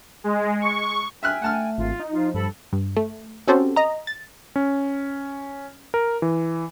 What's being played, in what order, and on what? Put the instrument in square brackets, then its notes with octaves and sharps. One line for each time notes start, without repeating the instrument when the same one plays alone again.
[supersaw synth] G#3
C#6
[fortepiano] E5 F6 F#6 [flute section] G5 G#5
[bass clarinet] A3 [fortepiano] F#5 A5 F6
[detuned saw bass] G#1 [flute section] F4
[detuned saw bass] D#4
[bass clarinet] F3 [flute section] F4
[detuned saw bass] G2 [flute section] A4 B5
[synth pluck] G2
A3
C4 C#4 F#4 G4 A4 C5
D#5 A#5
A6
[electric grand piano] C#4
A#4
E3